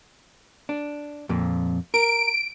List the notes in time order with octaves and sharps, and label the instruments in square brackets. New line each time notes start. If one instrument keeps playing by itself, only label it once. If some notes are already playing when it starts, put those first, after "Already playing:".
[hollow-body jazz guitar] D4
F2 A#2
[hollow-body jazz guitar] A#4 [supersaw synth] D7